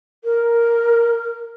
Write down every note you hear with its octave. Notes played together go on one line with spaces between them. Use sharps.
A#4